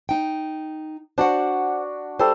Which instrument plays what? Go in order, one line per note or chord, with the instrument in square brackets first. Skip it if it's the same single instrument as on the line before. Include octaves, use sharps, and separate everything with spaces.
[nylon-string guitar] D#4 G5
[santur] D4 F#4 [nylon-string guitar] C5 D5 F#5
[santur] G3 A4 F5 [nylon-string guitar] C5